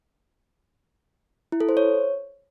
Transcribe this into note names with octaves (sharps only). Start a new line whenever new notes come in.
E4
A4
C5
C#5